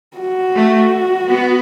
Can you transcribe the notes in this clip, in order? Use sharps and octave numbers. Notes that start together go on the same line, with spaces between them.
F#4
A3
B3